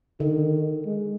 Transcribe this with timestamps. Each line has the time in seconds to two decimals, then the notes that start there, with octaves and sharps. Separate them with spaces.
0.20 D3 D#3
0.86 G#3